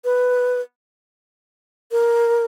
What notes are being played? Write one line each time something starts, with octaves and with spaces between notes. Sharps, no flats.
B4
A#4